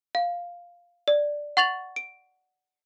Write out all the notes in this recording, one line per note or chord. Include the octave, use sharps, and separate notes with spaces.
F5
D5
F#5 C#6 A6 F7 F#7
D7